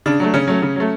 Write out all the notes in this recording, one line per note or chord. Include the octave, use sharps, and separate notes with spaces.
C#3 D4
F#3 A3
C#3 C#4
F#3 A3
C#3
F#3 A3